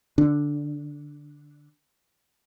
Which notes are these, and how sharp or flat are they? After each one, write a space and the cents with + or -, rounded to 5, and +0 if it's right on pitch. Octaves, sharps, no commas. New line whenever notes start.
D3 +0 D4 +0